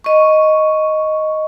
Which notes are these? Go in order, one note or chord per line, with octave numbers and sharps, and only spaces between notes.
D#5 C#6